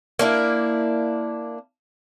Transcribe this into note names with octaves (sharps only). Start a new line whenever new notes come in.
A#3 D4 E4